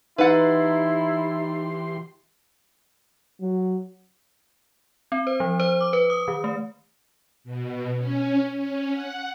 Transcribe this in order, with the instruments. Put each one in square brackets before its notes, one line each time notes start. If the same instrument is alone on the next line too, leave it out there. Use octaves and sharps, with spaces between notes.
[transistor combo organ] E3 G4 C6 [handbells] D#4 A6 [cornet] E4 [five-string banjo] B4 F#5
[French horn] F#3
[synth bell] C4
C5
F3
C5
D6
B4
D#6
D#3
A3
[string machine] B2
C#4
C#4
F#5